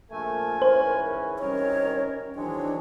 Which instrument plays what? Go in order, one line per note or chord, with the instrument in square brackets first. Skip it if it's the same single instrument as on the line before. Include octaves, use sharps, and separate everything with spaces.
[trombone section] A#1 A3 [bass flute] A#4 [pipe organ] G#5
[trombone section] G#2 E3 C#4 [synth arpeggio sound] C5
[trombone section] C2 D#3 [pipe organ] C#4 A#4 [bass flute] C#5
[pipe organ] D#3 E3 C#5 [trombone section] F#3 G#3 C4 [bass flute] D4